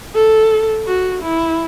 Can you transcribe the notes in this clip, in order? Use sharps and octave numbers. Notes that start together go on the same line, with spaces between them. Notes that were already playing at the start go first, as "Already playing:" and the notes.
A4
F#4
E4